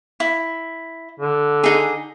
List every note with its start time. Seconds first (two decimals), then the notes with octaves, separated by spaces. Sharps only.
0.20 E4
1.20 D3
1.64 D#4 G#4